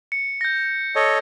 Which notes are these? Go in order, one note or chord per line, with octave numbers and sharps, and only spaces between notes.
C#7
G6 A#6
A4 C#5 D#5